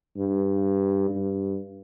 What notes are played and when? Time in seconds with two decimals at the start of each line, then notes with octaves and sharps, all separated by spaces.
0.17 G2
1.10 G2